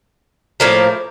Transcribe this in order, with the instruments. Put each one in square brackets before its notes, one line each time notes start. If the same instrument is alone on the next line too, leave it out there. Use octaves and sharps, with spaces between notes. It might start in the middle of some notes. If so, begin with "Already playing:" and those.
[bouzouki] A2 F3 A#3